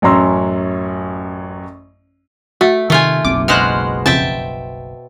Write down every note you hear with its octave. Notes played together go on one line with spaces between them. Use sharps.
A1 F#2 C#4 A#5 C6 E6
A3 F#4
C3 D#3 A3 F4 G#5
F#1 B1 C4 D6
B2 G#3 C5 F6 F#6
F2 C#3 E5 G5 A5